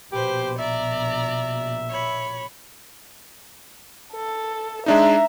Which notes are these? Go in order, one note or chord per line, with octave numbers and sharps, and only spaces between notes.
A#1 B2 G4 B4 C5
D5 E5 A#5
C#5 B5
A4
G#3 D4 D#4 E5 A#5